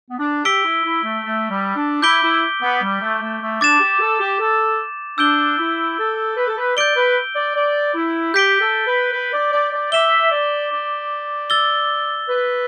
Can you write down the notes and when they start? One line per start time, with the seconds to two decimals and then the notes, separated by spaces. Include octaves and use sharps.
0.10 B3
0.18 D4
0.45 G4 E6 B6 D7 G7
0.65 E4
0.84 E4
1.04 A3
1.24 A3
1.50 G3
1.76 D4
2.02 E4 D6 G6 B6 D7 G7
2.23 E4
2.62 B3
2.82 G3
3.01 A3
3.21 A3
3.41 A3
3.61 D4 D6 A6 E7
3.80 G4
4.00 A4
4.20 G4
4.39 A4
5.18 D4 E6 G6 D7 G7
5.58 E4
5.98 A4
6.37 B4
6.47 A4
6.58 B4
6.76 D5 G6 D7 G7
6.96 B4
7.36 D5
7.55 D5
7.95 E4
8.34 G4 G6 B6 D7 G7
8.61 A4
8.87 B4
9.13 B4
9.33 D5
9.53 D5
9.72 D5
9.92 E5 D6 B6 E7 G7
10.31 D5
10.71 D5
11.50 E6 A6 G7
12.29 B4